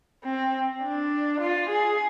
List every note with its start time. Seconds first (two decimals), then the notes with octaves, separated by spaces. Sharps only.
0.25 C4
0.83 D4
1.41 F4
1.70 G#4